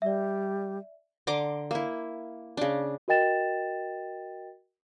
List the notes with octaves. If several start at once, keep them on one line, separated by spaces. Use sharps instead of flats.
G3 D5 E5
D3 A#5 C6 D6
A#3 E4
C#3 D4
F#4 A#4 D#5 G5 A6 E7